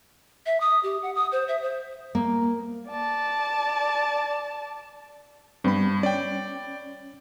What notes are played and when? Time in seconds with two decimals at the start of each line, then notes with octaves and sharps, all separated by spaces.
0.46 E5
0.60 D#6
0.83 G4
1.03 F#5
1.15 D#6
1.32 C5
1.48 E5
1.62 C5
2.15 A#3
2.89 D5 A5
5.64 G2 G3 B3 C4 B5
6.03 C#4 D5 G5